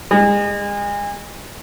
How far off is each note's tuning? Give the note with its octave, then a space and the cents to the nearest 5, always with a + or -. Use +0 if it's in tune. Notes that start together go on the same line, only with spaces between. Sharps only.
G#3 -35